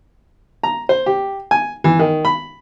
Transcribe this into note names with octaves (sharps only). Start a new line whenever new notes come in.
A#5
C5
G4
G#5
E3
D#3
B5